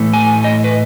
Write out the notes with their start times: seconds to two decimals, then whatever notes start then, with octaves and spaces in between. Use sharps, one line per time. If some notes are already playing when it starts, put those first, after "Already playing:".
Already playing: A2 E3 A3
0.14 G#5
0.44 D#5
0.64 B4